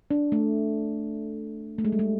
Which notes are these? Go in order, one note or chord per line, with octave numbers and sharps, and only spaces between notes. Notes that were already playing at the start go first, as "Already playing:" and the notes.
D4
A3
A3
G#3
G3
G#3